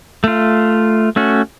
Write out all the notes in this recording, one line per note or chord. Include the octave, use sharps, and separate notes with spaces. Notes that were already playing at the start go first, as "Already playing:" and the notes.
A3 F4
A3 C#4 F#4